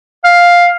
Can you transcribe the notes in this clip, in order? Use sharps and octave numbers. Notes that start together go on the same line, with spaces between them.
F5